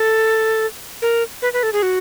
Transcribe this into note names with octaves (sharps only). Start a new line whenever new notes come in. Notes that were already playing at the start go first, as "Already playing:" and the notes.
Already playing: A4
A#4
B4
B4
A4
G#4
F#4